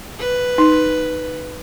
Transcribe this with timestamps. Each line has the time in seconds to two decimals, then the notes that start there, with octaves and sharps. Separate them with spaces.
0.19 B4
0.58 D#4